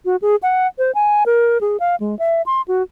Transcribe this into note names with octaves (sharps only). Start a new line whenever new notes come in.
F#4
G#4
F#5
C5
G#5
A#4
G#4
F5
G#3
E5
C6
F#4